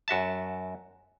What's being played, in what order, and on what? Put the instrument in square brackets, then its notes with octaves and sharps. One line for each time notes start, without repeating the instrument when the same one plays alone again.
[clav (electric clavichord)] F#2 F#4 E5 A5